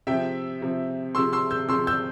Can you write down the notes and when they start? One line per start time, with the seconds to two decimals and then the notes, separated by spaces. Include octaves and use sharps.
0.07 C3 F3 E5 G5
0.62 C3 F3
1.15 C3 F3 C6 E6
1.33 C6 E6
1.51 E6 G6
1.69 C3 F3 C6 E6
1.87 E6 G6